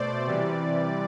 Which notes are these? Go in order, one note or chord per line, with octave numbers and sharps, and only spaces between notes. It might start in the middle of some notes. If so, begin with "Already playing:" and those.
Already playing: B2 A3 C5 D5
C3 E3 G3